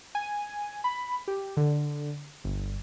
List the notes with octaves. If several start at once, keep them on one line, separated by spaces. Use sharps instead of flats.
G#5
B5
G4
D3
G1